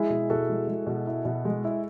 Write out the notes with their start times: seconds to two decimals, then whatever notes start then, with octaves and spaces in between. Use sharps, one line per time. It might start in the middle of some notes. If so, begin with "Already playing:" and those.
Already playing: G#3 E4 G#4
0.10 B2
0.30 B2 F#4 A4
0.49 G#3
0.67 G#3
0.87 B2
1.07 E4
1.25 B2
1.45 G#3
1.65 E4